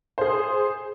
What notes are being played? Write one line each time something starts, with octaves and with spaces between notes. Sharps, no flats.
G#4 C5